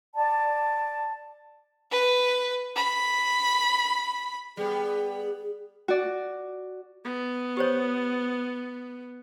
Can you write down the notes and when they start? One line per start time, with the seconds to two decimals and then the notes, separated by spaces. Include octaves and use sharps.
0.16 D5 A5
1.91 B4
2.76 B5
4.57 G3 B3 G#4
5.88 F#4 D5
7.05 B3
7.57 G4 C5 C#5